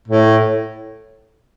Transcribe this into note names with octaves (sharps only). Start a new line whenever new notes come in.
A2